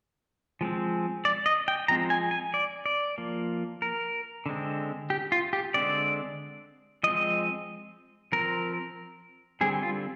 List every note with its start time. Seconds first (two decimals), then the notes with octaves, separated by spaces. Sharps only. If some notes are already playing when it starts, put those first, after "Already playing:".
0.61 F3 G#3 C4
1.25 D5
1.46 D#5
1.68 G5
1.88 F3 G#3 C4 A#5
2.10 G#5
2.31 G#5
2.54 D5
2.86 D5
3.18 F3 A#3
3.82 A#4
4.46 D3 G#3 C4
5.10 G4
5.32 F4
5.53 G4
5.74 D3 G#3 C4 D5
7.03 F3 G#3 C4 D#5
8.32 F3 C4 A#4
9.61 D3 G3 C4 G#4
9.83 F4